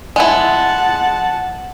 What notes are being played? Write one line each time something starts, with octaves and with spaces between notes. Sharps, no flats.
G#3 E4 F#5 A5